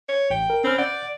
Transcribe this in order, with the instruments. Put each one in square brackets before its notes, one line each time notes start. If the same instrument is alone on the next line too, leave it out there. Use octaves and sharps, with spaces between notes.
[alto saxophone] C#5
[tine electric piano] A1 [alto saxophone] G5
[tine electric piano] A#4
[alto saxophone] C4 [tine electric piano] C#4 B5 F6
[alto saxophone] D5 [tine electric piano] F#5 G6